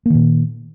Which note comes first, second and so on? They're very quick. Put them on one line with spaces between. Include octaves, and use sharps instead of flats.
A#3 D#3 A#2